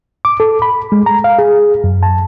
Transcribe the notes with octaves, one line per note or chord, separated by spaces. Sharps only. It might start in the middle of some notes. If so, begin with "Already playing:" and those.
D6
A4
B5
G#3
A#5
F5
G#4
F#2
A5